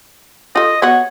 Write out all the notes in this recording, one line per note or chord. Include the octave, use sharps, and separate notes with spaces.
F4 A4 D#5
B3 F#4 C#5 F#5